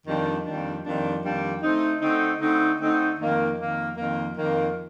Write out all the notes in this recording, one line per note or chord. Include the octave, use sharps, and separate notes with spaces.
F2 D#3 G3 A#3 D4
F2 D#3 G3 A#3 D4
F2 D#3 G3 A#3 D4
F2 D#3 G3 A#3 D4
D3 A3 C4 D#4
D3 A3 C4 D#4
D3 A3 C4 D#4
D3 A3 C4 D#4
F2 D#3 A#3
F2 D#3 A#3
F2 D#3 A#3
F2 D#3 A#3